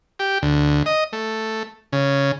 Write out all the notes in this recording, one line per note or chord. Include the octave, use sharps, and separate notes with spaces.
G4
D2
D#5
A3
C#3